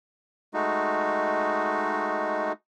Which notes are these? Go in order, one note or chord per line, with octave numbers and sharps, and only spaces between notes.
G#3 A3 D#4 F#4